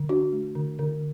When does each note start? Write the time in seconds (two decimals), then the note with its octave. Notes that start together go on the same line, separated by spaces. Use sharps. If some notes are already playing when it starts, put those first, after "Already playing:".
Already playing: D3
0.09 D4 F#4
0.32 A3
0.55 D3
0.79 D3